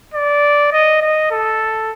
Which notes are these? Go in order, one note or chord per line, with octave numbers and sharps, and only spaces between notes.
D5
D#5
D#5
A4